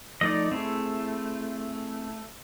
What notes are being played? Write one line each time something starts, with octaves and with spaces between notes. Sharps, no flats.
F3 A3 D#4 D5 D#5
A3 C4 E4 G#4